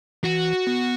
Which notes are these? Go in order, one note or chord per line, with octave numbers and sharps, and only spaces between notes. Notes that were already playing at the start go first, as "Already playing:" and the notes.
E3 F#4
B3